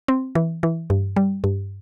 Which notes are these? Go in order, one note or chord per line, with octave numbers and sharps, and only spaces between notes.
C4
E3
E3
G2
G3
G2